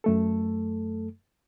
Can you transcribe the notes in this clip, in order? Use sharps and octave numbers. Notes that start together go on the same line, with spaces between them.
F#2 A3 A4